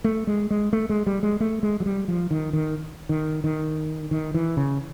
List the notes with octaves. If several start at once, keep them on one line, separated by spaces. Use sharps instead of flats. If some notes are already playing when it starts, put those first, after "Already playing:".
A3
G#3
G#3
A3
G#3
G3
G#3
A3
G#3
F#3
G3
F3
D#3
D#3
D#3
D#3
D#3
E3
C#3